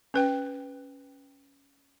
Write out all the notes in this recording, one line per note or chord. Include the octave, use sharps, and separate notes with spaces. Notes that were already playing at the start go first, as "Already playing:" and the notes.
C#4 B4 G5